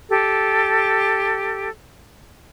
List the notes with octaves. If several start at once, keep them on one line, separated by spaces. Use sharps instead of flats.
G4 A4